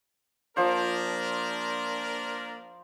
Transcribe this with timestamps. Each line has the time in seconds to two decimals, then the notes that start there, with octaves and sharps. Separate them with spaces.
0.57 F3 A#3 D4 A#4 C5